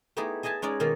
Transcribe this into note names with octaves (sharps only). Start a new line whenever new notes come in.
A3 B3 D#4 E4 G4 G#4
G#4 D#5 E5 G#5 A5
G#3 C#4 D#4 G#4 D5
B2 D#3 A#3 D#4 F4